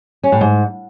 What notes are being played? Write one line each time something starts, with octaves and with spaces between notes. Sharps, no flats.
C#4
A2
G#2